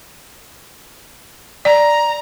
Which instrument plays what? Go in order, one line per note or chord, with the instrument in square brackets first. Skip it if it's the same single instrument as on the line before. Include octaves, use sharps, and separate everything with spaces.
[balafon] D5 [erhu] A#5